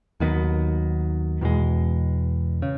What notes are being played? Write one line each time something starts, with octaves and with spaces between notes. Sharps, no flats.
D#2 D#3 F#3 B3
E2 B2 G#3
C#3